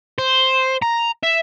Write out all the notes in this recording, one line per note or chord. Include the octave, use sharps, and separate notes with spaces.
C5
A#5
E5